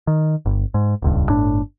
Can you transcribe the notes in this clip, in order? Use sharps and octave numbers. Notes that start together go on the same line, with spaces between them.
D#3
G1
G#2
D#1 C#2 G2
G1 A2 D4